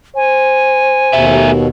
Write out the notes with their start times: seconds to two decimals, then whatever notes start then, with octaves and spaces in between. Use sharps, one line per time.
0.16 C5 G#5
1.13 D#2 B2 A3 G4 E5